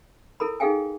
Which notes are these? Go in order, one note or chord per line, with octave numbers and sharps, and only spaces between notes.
E4 A4 A#4 B5
D#4 G#4 A4 F5 G5 G#5